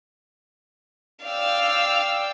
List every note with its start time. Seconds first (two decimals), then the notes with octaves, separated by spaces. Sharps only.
1.24 D5 F5 G5 E6